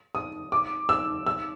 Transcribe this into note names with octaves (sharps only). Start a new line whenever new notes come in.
D#6
D6
E6
E6